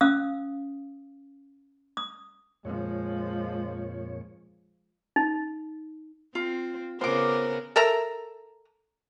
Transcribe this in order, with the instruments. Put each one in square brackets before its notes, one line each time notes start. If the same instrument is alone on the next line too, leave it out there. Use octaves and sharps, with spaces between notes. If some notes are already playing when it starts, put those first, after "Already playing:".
[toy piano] C#4 F5 D#6 E6
D#6
[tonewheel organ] F2 A#2 C#5 [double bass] F3 G#3
[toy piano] D#4
[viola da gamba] C4 [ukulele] F4
[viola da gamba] C#3 B3 A#4 [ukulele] F4 [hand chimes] C5 [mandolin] C6 D6
[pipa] A4 A#4 E5 A#5